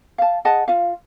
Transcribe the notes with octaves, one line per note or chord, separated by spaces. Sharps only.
F5 A5
G#4 D#5 F#5 A5
F4 F5